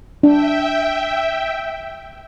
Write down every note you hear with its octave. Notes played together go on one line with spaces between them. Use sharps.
D4 E5 G5